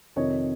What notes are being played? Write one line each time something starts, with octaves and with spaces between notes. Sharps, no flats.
F2 C3 D#3 C#5 D#5